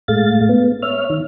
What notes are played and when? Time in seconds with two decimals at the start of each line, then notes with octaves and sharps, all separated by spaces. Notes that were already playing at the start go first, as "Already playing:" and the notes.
0.08 A2 G#3 A3 F5 A6
0.49 B3
0.83 C#5 E5 F6
1.10 D#3